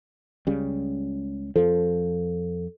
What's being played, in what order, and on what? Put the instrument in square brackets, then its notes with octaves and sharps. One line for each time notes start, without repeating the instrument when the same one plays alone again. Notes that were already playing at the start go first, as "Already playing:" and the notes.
[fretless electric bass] C#2 C#3 G3
[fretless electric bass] F2 F3 [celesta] A4